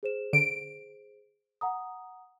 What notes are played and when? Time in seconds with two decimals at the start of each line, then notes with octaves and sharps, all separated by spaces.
0.03 G#4 C5 E7
0.33 D3 D7
1.61 F#5 A#5 D#6